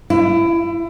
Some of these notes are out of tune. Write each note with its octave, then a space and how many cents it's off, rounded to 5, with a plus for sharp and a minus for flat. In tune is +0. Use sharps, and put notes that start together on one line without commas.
E4 +25